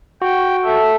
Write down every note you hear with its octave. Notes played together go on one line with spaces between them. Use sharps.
F#4 G5
A4 E5